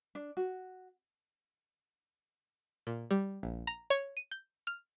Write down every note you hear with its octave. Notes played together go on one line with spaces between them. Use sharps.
D4
F#4
A#2
G3
A#1
A#5
C#5
D#7
G6
F6